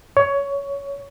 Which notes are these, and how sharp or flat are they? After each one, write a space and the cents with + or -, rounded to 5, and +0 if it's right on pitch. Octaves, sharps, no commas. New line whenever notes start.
C#5 +15